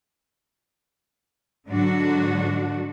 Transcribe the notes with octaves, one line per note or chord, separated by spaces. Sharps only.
G#2 D3 F#3 D4 F#4